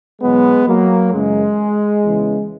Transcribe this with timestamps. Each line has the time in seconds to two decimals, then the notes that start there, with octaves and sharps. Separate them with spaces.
0.21 E2 B2 F#3 G#3 B3
0.67 F#3 A#3
1.12 F#2 C#3 E3 G#3
2.04 E2 C#3 E3